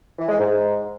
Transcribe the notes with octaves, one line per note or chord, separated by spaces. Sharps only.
E3
G#3
G#2